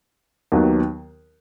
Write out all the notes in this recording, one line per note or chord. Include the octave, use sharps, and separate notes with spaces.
D#2 D#3 F#3 B3